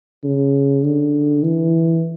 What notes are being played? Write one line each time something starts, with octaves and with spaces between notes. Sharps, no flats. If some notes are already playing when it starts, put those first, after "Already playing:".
C#3
D3
E3